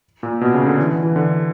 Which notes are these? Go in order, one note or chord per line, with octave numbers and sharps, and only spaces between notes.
A#2
B2
C#3
D3
E3
E3
D3